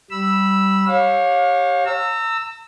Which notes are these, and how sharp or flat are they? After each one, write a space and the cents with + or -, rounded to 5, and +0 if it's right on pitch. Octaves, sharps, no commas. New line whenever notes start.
G3 -20 B5 -15 E6 +0
G4 +0 C#5 -15 F5 +30
A#5 -40 E6 +0